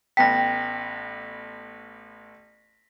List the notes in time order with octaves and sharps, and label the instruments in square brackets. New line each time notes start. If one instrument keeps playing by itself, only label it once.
[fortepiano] A1 B3 A5 [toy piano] G5 [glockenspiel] A#6 B6